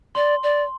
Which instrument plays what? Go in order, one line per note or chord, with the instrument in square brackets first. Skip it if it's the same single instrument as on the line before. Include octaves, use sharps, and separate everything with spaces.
[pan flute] D5 [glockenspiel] C6
[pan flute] D5